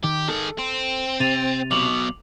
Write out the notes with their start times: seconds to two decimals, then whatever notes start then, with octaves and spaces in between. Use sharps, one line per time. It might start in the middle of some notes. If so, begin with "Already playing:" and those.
0.04 D#3 G4
0.29 D#3 G#4 A4
0.59 C4
1.20 C3 A6 D#7 F7
1.71 B1 B2 D6 F7 F#7